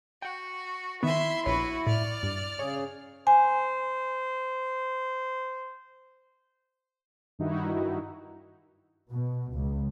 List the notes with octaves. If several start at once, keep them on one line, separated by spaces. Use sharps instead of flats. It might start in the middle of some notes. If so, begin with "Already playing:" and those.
F#4 F#5 G5
D#3 B3 E4 E5 C6
A#1 F#4 B4 C#5
A2 D5 F6
G2
C#3 G#4 C#5
C5 G#5
G2 D#3 D#4 E4 F#4
B2
C#2